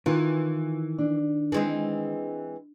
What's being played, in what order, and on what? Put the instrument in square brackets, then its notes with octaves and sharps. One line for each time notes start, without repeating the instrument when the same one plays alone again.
[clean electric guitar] D#3 [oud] E3 [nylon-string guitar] F4
[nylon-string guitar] D4
[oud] E3 G#3 C4